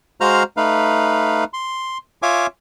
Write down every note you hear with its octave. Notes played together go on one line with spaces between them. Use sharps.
G#3 F#4 C5 F5 A#5 F6
A3 D#4 B4 F5
C6
F4 C#5 E5 F5 G#5 D6